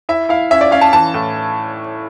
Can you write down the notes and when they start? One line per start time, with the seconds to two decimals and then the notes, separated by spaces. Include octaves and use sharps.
0.09 E4 E5
0.29 E4 F5
0.51 C#4 E5
0.61 D5
0.71 C#4 F5
0.81 A5
0.93 E3 A5
1.14 A2